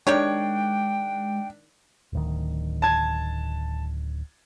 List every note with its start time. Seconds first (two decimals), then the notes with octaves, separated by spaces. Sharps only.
0.07 D#3 G#3 D4 G4 C#5 G5
2.13 D1 D2 D#3
2.82 A5 G#6